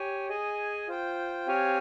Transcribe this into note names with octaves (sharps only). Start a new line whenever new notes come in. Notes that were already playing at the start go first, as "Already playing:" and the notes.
Already playing: G4 C#5 G#5
G#4 D#5 G#5
F4 C5 G5
C4 G4 C#5 F5 G#5